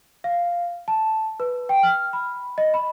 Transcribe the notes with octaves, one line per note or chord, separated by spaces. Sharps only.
F5
A5
B4
G5
F6
B5
D#5
B5